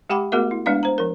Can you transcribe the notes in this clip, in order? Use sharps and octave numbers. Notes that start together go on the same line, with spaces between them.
G#3 G4 F#5 G5 B5 D6
A3 B3 F#4 G#4 A#4 E5
E4
G#3 B3 D4 B4 D5 F5
C5 A#5
F3 A#4